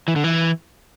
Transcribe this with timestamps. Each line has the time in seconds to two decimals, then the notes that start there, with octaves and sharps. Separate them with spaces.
0.08 E3
0.16 D3
0.24 E3